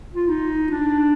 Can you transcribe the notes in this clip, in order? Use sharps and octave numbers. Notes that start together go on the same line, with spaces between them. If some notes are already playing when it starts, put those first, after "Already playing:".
F4
D#4
D4